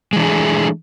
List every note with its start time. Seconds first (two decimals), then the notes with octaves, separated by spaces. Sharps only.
0.13 G#3
0.16 E3
0.20 D4
0.23 G#4
0.26 A3